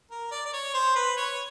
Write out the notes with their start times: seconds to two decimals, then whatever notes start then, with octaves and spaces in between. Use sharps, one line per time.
0.11 A#4
0.31 D5
0.46 D5
0.54 C#5
0.74 C5
0.96 B4
1.17 C#5